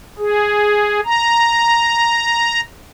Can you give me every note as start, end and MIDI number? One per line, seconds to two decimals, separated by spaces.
0.19 1.00 68
1.05 2.61 82